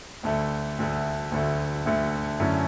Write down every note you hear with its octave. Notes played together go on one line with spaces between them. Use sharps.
D2 D3 A3
D2 D3 A3
D2 D3 A3
D2 D3 A3
F#2 D3 A3 C#4 E4